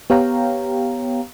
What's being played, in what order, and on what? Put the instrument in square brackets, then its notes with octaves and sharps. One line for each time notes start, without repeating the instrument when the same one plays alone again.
[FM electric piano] B3 G4 C#5 F5 G5 A#5